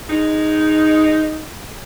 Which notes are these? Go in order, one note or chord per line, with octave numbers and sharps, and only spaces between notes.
G#3 D#4